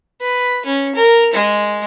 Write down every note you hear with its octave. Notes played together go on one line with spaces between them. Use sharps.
B4
C#4
A#4
G#3